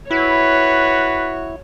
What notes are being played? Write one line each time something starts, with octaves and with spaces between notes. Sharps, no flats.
E4 F#4 B4 C#5